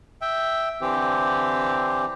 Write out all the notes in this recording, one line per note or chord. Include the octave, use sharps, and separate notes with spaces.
E5 G5
D3 E3 C4 G4